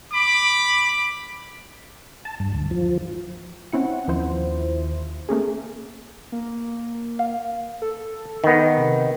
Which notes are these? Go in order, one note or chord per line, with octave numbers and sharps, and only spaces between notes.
B5 D6
A5
G2
D2
F3
C4 C#4 E4 F#5
D#2 F3 E4 C5
A3 A#3 C#4 G#4
A#3
F5
A4
D#3 B3
C3